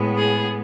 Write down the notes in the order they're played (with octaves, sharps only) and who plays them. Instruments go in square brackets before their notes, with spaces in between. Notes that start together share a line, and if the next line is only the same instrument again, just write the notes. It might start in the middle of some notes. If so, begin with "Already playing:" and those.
Already playing: [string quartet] A2 G#3 B3
G#4